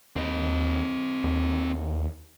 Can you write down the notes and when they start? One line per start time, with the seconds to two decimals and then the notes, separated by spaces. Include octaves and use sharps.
0.16 D#2 C4 D#5
1.24 D#2